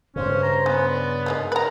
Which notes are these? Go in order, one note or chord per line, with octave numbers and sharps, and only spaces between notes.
G2 C#3 C#4 C5
A#5
B3 C#4
D5
G#3 A#3 D#4
A#4 B4 A#5